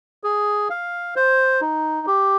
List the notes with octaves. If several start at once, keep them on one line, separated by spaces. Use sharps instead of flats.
G#4
F5
C5
D#4
G4